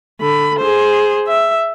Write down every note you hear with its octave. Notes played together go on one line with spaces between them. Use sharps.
D3 B5
G#4 C5
E5